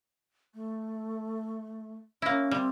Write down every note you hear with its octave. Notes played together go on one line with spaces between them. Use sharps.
A3
A#3 C#4 E4
G3 C4